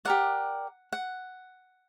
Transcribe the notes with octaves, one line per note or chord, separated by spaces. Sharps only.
G4 A#4 D5 F#5
F#5